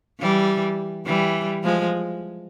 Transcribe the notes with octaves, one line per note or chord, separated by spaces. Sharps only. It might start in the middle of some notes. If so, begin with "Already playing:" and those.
E3 G3
E3 G3
F3 G#3